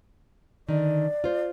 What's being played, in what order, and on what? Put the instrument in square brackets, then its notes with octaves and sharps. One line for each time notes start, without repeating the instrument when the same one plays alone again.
[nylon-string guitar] D3 D#3 [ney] D5
[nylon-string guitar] F4 C5